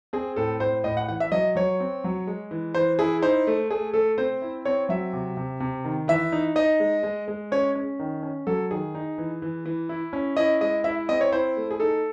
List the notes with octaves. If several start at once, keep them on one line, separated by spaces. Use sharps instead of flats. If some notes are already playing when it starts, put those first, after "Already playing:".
C4 G#4
A2 A4
A2 C5
A2 D#5
F#5
E3 F#5
E5
F#3 D#5
F#3 C#5
C4
F#3
G#3
E3
E3 C5
E4 G#4
D#4 C5
A3
A3 G#4
A3 A4
C4 C5
E4
C4 C#5
F#3 E5
C3
C3
C3
D#3
E3 E5
D#4
D#4 D#5
G#3
G#3
G#3
C#4 C#5
C#4
D#3
C#4
F#3 A4
D#3 G#4
D#4
E3
E3
E3
E4
C#4
E4 D#5
G#3 D#5
E4 E5
C4 D#5
C#5
E4 C5
A3
G#4
D#4 A4